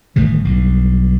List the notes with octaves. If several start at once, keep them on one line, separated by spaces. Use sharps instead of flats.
G1 A2 D#3 E3
B1 G2